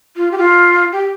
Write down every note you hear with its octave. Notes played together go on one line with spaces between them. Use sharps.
F4
G4
F4
G4